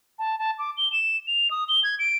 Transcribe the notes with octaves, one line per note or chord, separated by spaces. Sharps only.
A5
A5
D6
G7
E7
F7
D#6
G7
G#6
D7